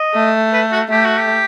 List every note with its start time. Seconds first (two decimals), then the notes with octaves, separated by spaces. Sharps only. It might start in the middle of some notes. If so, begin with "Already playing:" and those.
Already playing: D#5
0.14 A3
0.53 B4
0.72 F#4
0.91 A3 G4
1.04 F#4
1.17 G4